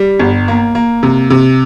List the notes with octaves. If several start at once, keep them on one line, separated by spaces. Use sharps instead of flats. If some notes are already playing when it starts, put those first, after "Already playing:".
Already playing: G3
G1
A#3
A#3
C3
C3